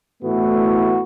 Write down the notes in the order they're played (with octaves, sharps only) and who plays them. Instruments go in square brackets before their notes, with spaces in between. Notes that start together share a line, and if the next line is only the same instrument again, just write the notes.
[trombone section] A2 E3 A3 B3 F#4